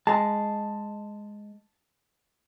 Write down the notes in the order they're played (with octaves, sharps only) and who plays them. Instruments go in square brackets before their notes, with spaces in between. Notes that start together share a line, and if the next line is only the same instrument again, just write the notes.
[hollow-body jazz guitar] G#3 [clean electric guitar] A5